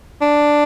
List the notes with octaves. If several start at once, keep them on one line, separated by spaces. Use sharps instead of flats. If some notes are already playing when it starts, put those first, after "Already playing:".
D4